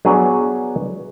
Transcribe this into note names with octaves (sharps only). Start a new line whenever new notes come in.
F#3 B3 D4 G#4